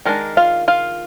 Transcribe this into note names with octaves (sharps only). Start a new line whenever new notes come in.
D#3 G#3 D4 A#4
F4 F5
F4 F5